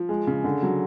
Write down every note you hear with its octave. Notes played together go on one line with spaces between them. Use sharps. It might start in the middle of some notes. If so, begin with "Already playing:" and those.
Already playing: F3
G#3
C#3
D3
F#3